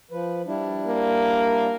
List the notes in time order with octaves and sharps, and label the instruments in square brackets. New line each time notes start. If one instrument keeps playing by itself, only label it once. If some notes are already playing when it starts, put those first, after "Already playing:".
[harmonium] F3 B4
G3 D4 E4
[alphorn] A#3